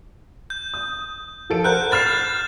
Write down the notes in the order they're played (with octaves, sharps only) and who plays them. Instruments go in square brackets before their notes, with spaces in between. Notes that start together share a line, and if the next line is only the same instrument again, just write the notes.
[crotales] G6
[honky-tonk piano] D#6
F3 A4 D7
[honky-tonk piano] A#4 C5 F#5 [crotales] F#6 G6
[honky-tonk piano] B5 F6 C7 [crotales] G6 A6 E7